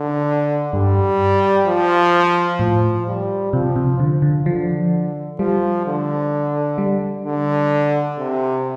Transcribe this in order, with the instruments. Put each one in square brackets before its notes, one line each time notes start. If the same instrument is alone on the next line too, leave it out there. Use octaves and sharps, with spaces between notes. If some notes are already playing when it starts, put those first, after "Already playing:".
Already playing: [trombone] D3
[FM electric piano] G2 [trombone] G3
[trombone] F3
[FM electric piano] A2 [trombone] F3
[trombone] G3
[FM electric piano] C3 [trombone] F3
[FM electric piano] C3
[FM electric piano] D3 [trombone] F3
[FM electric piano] D3
[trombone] D3 [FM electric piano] F3
[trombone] F3 [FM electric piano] G3
[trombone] D3
[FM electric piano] G3
[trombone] D3
C3